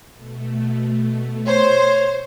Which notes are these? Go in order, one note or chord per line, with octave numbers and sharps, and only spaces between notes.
B2 A3
C5 C#5